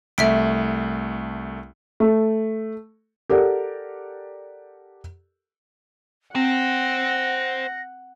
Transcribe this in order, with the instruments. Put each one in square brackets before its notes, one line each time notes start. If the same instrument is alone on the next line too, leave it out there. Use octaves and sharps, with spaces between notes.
[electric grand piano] C2 A3 [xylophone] E5 B6 D7
[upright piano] A3
[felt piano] G4 A4 A#4 D5 F#5
[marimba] C4 [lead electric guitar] C5 G5 [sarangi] F#5 [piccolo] A#6